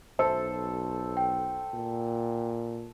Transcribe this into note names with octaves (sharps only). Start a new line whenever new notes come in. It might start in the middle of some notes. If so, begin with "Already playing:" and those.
B1 A4 C5
G5
A#2